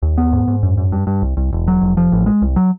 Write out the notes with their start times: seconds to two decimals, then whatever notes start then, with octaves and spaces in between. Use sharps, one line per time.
0.03 D#2
0.18 B3
0.33 G#2
0.48 G#2
0.63 F#2
0.78 F#2
0.92 G2
1.07 G2
1.22 C2
1.37 C2
1.53 E1
1.68 F#3
1.81 F1
1.97 F3
2.12 A1
2.26 G#3
2.42 C2
2.56 F#3